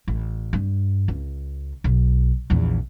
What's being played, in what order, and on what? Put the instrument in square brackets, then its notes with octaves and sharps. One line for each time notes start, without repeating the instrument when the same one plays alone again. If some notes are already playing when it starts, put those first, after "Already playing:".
[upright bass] A1
G2
C#2
B1
A#1 E2